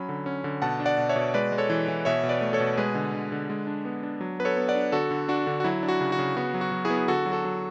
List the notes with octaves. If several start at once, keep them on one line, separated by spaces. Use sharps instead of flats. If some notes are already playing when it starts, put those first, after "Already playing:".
Already playing: F#3 C#4 B5
D3
C#4
D3
B2 F#5 A5
D4
D5 F#5
B2
C#5 E5
B2
G#3 B4 D5
G#3
A4 C#5
E3
E3
B2 C#5 E5
B2
B4 D5
A3
A4 C#5
B2
G#3 G#4 B4
D3
D3
D3
G#3
D4
B3
D4
F#3
B3 B4
A4 C#5
B3
D5 F#5
D4
D3 F#4 A4
D3
D4 F#4
D3
F#4
F#3 E4
D4
F#4
C#3
F#4
C#3
B3 F#4
F#3
F#4
F#3
E4 G#4
B3
D3 F#4 A4
F#3
F#4 A4
F#3